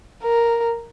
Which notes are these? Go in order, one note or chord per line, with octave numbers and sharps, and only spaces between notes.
A#4